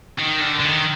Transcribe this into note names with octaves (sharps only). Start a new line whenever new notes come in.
D#3
D3
D3
D#3